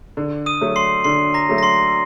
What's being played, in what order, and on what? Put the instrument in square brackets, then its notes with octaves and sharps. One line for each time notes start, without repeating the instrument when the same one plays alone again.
[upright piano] D3
[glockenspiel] D#6 D#7
[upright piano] F#3 A3
[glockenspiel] C6 C7
[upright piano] D3 [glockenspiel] C6 C7
[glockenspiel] A#5 A#6
[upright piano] F#3 A3
[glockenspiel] A#6
C6 C7